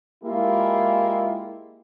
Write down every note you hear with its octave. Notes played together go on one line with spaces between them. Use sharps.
G#3 A#3 E4 F4 G4